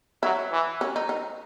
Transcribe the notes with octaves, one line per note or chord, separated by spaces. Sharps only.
F#3 E4
E3
C#4
D#4
D#4